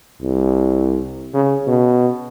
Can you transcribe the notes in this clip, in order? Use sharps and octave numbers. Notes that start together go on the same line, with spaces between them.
C2
C#3
B2